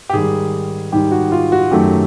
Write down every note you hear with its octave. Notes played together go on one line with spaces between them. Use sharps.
G4
G#2 D#3 G3 G#4
G#2 D#3 G3 G4
F#4
F4
F#4
F#2 D#3 F#3 A3 G4